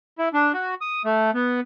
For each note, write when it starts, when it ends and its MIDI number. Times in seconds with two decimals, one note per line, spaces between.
0.18 0.29 64
0.33 0.52 62
0.54 0.75 66
0.81 1.02 87
1.05 1.31 57
1.35 1.60 59